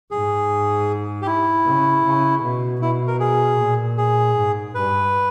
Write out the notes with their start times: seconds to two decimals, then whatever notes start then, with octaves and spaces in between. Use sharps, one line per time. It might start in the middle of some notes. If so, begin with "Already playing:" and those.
0.11 G#2 G#4
1.22 G4
1.27 E4
1.65 C#3
2.05 C#3
2.43 B2
2.81 B2 E4
3.07 A#4
3.20 G#4
3.59 A#2
3.98 G#4
4.36 G#2
4.75 G2 B4